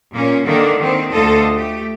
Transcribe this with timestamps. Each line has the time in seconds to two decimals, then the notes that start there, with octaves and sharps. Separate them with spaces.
0.13 A#2 A#3 C#4
0.45 D3 D#3 A#3 D4
0.78 D#3 C4
1.11 D2 D3 F4 A4 D#5
1.54 A3 G4